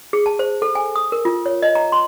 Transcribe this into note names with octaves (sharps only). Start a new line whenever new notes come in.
G#4
A5
C5
A4
G#5
D#6
A#4
F4
C#5
D#5
A#5
C6